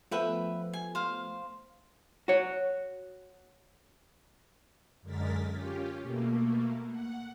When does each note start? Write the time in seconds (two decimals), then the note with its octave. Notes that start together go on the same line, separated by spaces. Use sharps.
0.11 F3 A3 B3 B4 E5 G5
0.73 G#5
0.95 C5 F5
2.28 F#4 C#5
5.01 F#2 D3 G#3 A#4 A6 B6
5.48 C#4 F4 G4
6.01 B2 A3 A#3
6.90 F#5